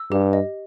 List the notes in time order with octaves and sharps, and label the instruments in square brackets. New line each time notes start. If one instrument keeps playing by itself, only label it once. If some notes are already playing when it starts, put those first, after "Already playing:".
Already playing: [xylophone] E6
[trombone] G2 [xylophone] G4
[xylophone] D#5